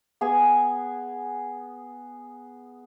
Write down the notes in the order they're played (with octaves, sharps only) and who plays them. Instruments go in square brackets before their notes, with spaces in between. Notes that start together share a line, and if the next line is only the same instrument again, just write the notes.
[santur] B3 G#4 G#5